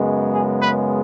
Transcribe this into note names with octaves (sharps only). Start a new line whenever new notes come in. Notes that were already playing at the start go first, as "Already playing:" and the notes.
Already playing: F#2 C#3 G#3 B3
G#4
B4